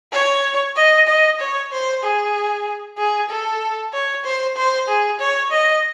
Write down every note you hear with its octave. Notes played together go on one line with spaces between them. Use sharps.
C#5
D#5
D#5
C#5
C5
G#4
G#4
A4
C#5
C5
C5
G#4
C#5
D#5